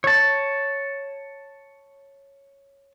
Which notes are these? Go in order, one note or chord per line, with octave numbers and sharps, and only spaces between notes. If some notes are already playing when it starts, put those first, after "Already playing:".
C#5 A5